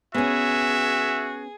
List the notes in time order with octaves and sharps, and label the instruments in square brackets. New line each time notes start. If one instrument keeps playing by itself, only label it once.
[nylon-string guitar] B3 C#4 [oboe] F#4 [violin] G#4 [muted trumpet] E5